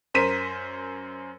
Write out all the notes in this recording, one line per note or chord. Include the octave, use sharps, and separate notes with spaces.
F#2 A#4 C5 B6 D#7